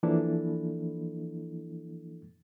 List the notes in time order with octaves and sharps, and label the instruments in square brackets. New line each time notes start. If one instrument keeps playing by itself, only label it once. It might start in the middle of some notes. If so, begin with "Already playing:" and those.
[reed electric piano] E3 F3 A#3 D4 E4 A4